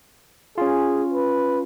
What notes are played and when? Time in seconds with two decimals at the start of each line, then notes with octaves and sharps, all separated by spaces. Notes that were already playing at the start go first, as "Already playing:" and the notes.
0.58 C#4 F4 G#4
1.13 B4